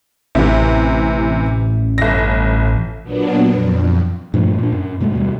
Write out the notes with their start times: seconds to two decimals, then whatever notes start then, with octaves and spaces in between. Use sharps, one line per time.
0.35 A1 C3 E3
1.98 G1 A#6
3.03 A#2 F#3 B3 D4
3.51 F2
4.34 G2 A#2 F3 A3
4.59 A#2 D4
4.72 F#2
5.00 G#2 B2 G#3 A3
5.13 D#2 B2 G3